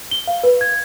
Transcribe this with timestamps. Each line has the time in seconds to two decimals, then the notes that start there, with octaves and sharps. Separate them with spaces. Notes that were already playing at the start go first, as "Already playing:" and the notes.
0.11 G7
0.27 F5
0.43 B4
0.61 G#6